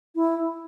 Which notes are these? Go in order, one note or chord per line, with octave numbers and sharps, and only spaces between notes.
E4